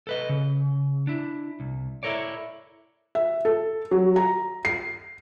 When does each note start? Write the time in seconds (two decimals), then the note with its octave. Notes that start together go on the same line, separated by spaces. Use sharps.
0.07 A4 B4 D#5
0.29 C#3
1.07 D4 E4
1.60 C2
2.03 E4 A4 A#4 C#5 D5
3.15 E5
3.45 A4
3.91 F#3
4.16 A#5
4.65 C7